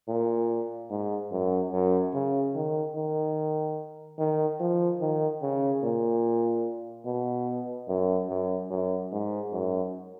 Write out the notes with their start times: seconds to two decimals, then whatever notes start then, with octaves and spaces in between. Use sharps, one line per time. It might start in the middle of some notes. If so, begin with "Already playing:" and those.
0.08 A#2
0.90 G#2
1.31 F#2
1.72 F#2
2.14 C#3
2.55 D#3
2.95 D#3
4.18 D#3
4.60 F3
5.01 D#3
5.42 C#3
5.83 A#2
7.06 B2
7.88 F#2
8.29 F#2
8.70 F#2
9.12 G#2
9.52 F#2